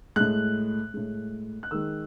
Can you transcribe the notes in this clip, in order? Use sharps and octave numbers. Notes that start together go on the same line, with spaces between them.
A2 G#3 F#6
A2 G#3
F#6
D#3 G#3 E6